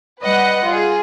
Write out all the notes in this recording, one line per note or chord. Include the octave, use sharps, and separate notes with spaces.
G3 B4 D#5 F#5
F4 G#4